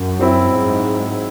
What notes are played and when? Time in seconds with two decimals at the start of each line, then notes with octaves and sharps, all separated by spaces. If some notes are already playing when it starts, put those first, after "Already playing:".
Already playing: F#2
0.19 F#3 C4 E4
0.49 G#2